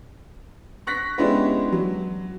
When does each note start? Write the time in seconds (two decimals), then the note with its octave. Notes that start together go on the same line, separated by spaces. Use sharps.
0.87 C#6 F#6 A#6 B6
1.18 G#3 B3 C#4 D4 E4 G4
1.72 F#3